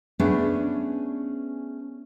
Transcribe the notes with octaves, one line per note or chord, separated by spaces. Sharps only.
A3 B3 C#4 D4 G#4 B4